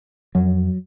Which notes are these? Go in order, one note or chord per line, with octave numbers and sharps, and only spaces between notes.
F2 F#3